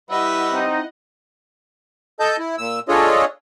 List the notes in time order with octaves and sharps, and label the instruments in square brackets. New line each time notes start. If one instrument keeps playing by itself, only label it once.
[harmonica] G3 B4 E5 [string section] E4 D#5 F#5
[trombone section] C4 D#4
[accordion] A4 D#5 A5 G6
E4
A#2 E6
D4 F4 G#4 A4 C#5 D#5